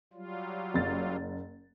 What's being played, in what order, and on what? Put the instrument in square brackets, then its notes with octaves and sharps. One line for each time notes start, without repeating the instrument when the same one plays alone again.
[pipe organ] F#3 G3 F4
[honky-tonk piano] F#1 A6